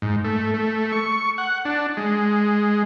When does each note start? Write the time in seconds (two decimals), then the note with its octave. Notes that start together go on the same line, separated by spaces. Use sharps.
0.02 G#2
0.24 A3
0.54 A3
0.92 C#6
1.38 F#5
1.65 D4
1.97 G#3